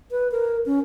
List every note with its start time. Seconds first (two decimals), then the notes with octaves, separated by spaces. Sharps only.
0.11 B4
0.32 A#4
0.66 C#4